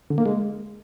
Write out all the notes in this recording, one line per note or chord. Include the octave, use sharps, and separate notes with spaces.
D3
A#3
G#3